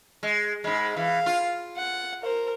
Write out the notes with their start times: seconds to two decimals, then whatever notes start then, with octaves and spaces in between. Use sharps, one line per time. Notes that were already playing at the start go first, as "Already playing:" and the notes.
0.23 G#3
0.64 G#2 G#3 B5
0.96 E3 F5
1.26 F4
1.76 F#5
2.23 A#4 C5